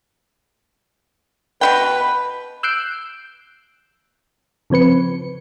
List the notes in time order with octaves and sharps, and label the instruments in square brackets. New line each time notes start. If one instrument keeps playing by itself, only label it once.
[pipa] B2 E4 G5 [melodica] B4
[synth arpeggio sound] E6 F#6 G6 C7 D7
C#3 F3 C4 B4 C#7